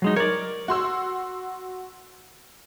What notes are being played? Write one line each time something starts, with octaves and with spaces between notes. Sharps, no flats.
F#3 G#3 D#4
A#4 C#5 D5
F#4 C6 E6